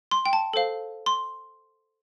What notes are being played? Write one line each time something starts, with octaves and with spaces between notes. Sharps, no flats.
C6
G5
A5
A4 C5 F5
C6